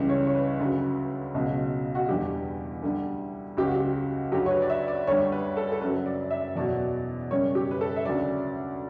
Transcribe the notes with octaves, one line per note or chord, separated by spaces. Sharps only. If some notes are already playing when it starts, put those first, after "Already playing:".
Already playing: C#2 C#3 E3 G3
C#5
C#5
B4
D2 C#3 F#3
C#2 B2 F#3
F#4
E2 D3 G3 G4
D2 D3 G3
C#2 C#3 F#3 G4
F#4
G4
D2 D3 F#3 G4
C#5
B4
D5
E5
D5
D2 D3 G3 C#5
B4
A4
A4
F#2 C#3 F#3 B4
D5
E5
E2 B2 F#3 D5
F#2 C#3 G3 C#5
G4
B4
A4
E5
D2 C#3 F#3 D5